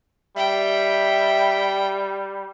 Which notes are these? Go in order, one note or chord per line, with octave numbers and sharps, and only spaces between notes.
G3 E5 G5